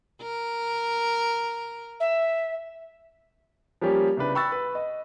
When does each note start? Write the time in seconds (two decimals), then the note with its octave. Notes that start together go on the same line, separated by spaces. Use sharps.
0.22 A#4
2.00 E5
3.81 F3 G3 A#3 C#4 G4
4.17 C2 C#3 D4 B4
4.35 G5 B5 C#6 E6 F#6 A6
4.52 B4
4.75 D#5